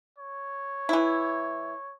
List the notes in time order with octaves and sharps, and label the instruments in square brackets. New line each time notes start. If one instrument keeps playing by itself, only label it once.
[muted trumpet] C#5
[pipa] E3 E4